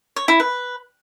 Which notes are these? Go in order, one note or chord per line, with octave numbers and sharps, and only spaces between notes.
C#5
E4
B4